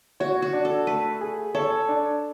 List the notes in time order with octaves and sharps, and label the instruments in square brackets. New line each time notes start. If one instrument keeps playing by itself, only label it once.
[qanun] F#4 [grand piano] C#5
[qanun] F#4
[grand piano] D4
[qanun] A4
[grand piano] A3 [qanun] B4
[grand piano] G#4
[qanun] A4 [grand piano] C#5
[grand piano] D4